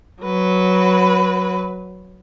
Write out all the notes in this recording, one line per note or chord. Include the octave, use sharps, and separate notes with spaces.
F#3 B4